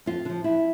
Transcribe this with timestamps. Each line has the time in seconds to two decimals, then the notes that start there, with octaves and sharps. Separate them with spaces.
0.06 F2 F4
0.25 D3
0.30 F3
0.44 F2 E4